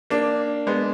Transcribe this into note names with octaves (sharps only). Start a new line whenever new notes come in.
A#3 D4
G#3 B3